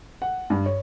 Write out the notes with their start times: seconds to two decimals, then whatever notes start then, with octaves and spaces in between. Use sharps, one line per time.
0.22 F#5
0.50 G2
0.66 C#5